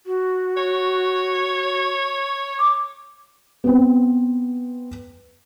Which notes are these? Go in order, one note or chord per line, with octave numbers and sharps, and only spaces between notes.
F#4
C#5
D6
B3 C4